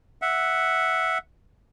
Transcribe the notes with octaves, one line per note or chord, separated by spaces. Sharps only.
E5 F#5